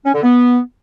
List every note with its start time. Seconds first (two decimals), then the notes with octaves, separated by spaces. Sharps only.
0.06 C#4
0.14 D3
0.23 B3